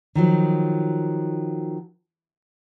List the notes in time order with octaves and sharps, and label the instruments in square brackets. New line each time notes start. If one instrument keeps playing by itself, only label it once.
[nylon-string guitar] D#3 F3 F#3